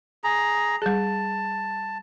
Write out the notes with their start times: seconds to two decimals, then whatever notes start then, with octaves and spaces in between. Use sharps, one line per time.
0.24 G#4 A#5
0.82 G3 G#4 A5